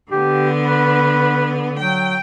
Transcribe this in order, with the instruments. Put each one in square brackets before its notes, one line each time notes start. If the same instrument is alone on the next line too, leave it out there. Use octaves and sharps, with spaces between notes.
[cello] D3 B3 [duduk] G4
[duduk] B4
[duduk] F#3 [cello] G5